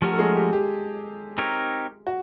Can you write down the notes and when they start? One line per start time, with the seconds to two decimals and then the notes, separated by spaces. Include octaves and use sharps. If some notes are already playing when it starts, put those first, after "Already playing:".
0.02 F3 A3 C#4 F#4 G4 A#4
0.13 A4
0.19 G#3 G#4
0.36 G4
0.53 G4
1.38 C4 D#4 G4 A#4 C#5
2.07 F#4